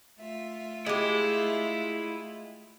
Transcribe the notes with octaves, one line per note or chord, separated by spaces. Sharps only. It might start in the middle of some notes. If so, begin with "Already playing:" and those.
A3 F4 E5
G#3 E4 G4